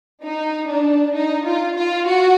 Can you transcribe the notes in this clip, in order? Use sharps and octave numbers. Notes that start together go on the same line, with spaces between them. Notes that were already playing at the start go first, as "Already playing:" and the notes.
D#4
D4
D#4
F4
F4
F#4